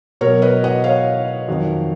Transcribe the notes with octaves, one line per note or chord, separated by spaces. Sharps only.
B2 F#3 A#4 C#5
B4 D#5
D#5 F#5
C#5 F5
F2 D#3 F#3